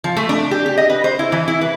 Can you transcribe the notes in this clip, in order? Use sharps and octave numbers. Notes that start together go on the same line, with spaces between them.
F3
A3
D4
G4
G4
D#5
B4
C5
E4
E3
E4
B4